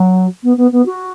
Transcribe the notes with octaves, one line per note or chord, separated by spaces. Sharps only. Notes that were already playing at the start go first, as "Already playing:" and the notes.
Already playing: F#3
B3
B3
B3
F#4